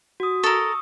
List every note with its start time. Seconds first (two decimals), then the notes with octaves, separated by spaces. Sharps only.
0.20 F#4 D#6
0.43 A4 A#4 C#6 D#6 E6